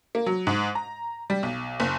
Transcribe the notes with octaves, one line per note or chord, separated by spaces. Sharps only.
A#3
F#3
G#2
A#5
G3
B1
F#1